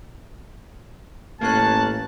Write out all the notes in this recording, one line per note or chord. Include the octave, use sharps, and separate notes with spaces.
A1 A#3 C#4 A5 F#6